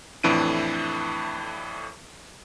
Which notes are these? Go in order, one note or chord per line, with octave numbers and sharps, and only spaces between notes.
F2 A2 E3 D4 D7 D#7